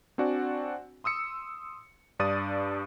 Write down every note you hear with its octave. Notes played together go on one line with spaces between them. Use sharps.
C4 D4 F#4 D5 F#5 G#5
C6 D#6 E6 C#7
G2 D4 D5 D#6 A6 D#7